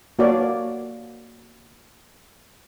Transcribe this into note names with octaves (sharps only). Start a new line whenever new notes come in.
A#3 F#4 B4 C#5 D5 F5